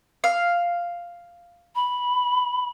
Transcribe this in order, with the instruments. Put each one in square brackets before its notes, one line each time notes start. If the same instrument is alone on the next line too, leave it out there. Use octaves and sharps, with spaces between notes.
[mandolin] F5
[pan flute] B5